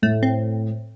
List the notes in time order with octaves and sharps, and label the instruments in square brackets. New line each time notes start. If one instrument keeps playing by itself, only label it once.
[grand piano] A2 [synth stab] A3
[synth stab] C4